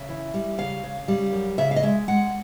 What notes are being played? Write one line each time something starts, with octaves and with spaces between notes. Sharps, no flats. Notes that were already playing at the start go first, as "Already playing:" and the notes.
Already playing: C#3 E5
E3
G3
C#3 F5
C#3
G3
F#2
C#3 E5
F5
D#5
G#3 E5
G#3 F#5